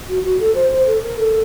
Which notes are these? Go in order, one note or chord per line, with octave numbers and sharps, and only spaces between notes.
F#4
F#4
A4
C5
C5
A4
A#4
A4